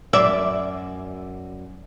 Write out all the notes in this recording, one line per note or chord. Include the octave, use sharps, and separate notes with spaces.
F#2 D5 E5